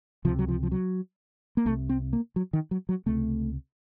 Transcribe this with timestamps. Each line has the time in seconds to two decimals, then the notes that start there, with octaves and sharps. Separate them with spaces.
0.25 C3 F3
0.28 C#2
0.39 F#3
0.48 F3
0.63 F3
0.72 F#3
1.57 A#3
1.65 C2 A3
1.69 C3
1.89 C4
2.13 A#3
2.36 F#3
2.53 D#3
2.71 F#3
2.89 F#3
3.06 C#2 C3 A3